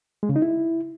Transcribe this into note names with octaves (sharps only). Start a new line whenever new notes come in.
G#3
C#3
D#4
E4